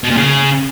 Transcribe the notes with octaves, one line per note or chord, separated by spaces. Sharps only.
B2
A#2
C#3